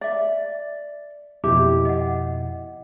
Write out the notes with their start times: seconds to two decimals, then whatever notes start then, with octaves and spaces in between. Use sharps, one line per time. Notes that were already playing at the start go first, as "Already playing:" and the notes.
0.01 D5 E5
1.44 F2 B2 E4 G4 D6
1.85 D#5 F#5